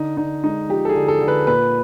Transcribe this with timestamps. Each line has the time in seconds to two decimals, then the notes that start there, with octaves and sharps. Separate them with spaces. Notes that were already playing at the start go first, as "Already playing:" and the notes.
Already playing: D3 D#4
0.17 D3 D#4
0.44 G#3 D#4
0.69 F3 G4
0.85 A4
0.89 G#4
0.95 D3
1.08 A4
1.22 D3
1.28 B4
1.47 A#2 B4